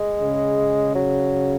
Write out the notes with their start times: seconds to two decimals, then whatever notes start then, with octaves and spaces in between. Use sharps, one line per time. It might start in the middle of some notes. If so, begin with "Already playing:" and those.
Already playing: G#3
0.21 C#3
0.95 F#3